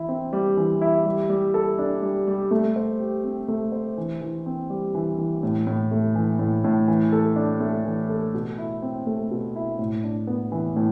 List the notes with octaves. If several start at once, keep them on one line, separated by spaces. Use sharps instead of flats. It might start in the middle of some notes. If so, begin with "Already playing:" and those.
Already playing: E3 E4
C4
G3
E3
E4
G3
G3
A4
D4
G3
G3
A3
C5
G4
C4
A3
C5
E3
E3
C4
G3
E3
E3
A2
A2
A3
E3
A2
A2
E3
A4
D4
A3
E3
A4
B2
E4
C4
A3
B2
E4
A2
D4
B3
E3
A2